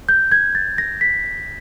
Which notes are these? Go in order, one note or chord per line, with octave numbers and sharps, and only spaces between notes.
G6
G#6
A6
A#6
B6